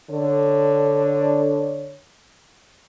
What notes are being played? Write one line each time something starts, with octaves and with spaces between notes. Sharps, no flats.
D3 C#5